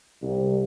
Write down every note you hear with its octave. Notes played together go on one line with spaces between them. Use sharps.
C2